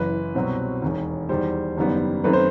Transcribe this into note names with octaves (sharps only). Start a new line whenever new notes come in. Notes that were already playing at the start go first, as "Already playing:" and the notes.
Already playing: F#1 F#2 E3 B4
C2 B2 F#3 C4
E1 D#2 D#3
E2 D#3 G3 C5
F#1 F#2 D#3 G3 B3
F#2 D#3 A3 C4 B4
C5